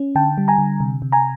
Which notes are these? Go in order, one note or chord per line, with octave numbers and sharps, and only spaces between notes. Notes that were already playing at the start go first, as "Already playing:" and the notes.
Already playing: C#4
D3 G5 A5
G3
G#5 A#5
D3
C3
C3
G#5 A#5